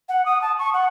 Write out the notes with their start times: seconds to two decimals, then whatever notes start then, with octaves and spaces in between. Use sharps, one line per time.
0.09 F#5
0.25 D#6
0.42 A5
0.59 C#6
0.73 F#5